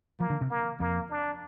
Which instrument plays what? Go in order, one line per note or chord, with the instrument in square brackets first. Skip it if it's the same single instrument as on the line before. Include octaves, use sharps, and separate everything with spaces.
[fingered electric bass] F3 [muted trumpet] A#3
[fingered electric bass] D3
C3
[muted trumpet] A#3
[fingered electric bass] F2 [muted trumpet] A#3
[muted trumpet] D4